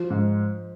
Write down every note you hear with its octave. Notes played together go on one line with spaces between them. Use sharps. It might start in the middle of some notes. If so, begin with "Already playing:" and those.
Already playing: F3
G#2